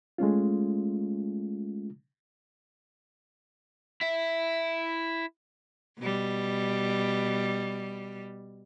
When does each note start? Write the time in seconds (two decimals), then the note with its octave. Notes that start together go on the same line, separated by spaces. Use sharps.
0.18 G#3 A3 C#4 F4
4.01 E4 E5
5.99 B2 G3